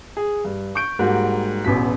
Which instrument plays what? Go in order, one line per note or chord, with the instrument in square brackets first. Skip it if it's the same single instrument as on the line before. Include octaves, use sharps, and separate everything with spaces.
[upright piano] G#4
G2
C#6 G6 D7
G#2 G3 A#3 F#4
E1 A1 B2 B6